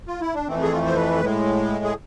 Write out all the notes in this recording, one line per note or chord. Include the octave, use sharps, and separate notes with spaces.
F4
E4
D4
F2 E3 A3 C4
G#4
F4
C5
B4
A2 G#3
G#4